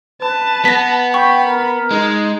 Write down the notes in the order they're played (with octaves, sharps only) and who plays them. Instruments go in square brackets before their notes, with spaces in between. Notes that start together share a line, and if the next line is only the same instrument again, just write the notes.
[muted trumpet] B4 [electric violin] A5
[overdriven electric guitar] B3 [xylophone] A#6 B6
[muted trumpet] G5 [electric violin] B5 [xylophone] C#6
[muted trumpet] A#4
[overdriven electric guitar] G#3 [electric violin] D#4